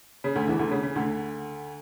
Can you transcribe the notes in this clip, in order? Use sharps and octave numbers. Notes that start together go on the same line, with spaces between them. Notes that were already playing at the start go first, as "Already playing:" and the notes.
C#3
D2 D3
E2 E3
D2 D3
C#3
C#3
D2 D3